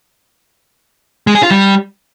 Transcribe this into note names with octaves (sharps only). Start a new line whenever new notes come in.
G#3
G#4
F4
G3